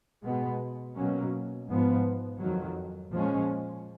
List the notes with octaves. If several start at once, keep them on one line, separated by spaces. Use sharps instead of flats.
B2 G#3 B3
B2 F#3 A#3 C#4
G#2 F3 B3
F2 D#3 F#3
A#2 F3 G#3 C#4